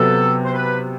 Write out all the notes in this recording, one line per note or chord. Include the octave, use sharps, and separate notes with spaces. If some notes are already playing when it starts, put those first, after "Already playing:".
Already playing: C3 F#3 B3 F#4 A4
C5
B4